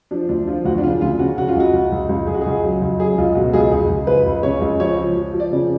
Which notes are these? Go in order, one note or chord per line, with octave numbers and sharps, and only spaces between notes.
F3 D4
D2 D4
F3 F4
D2 F#4
D4
C#3 F4
D2 F4
C#3 F#4
C#3 F#4
F4
C#2 F#4
C#2
C#2
C#2
C#2 G#4
F#4
C#2 G#4
F#3
C#2
F#3 G#4
C#2 F4
B2 F#4
C#2 G#4
C#2 G#4
C#2
C#2 B4
C#2
C#3 C#5
C#2
F3 C#5
F3
F3
F3
D5
C#3